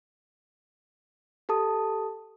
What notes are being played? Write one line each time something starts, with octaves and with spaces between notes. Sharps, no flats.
G4 A4 A5 D#6